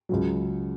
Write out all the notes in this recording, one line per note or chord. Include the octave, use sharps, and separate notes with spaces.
C#2 C#3 F#3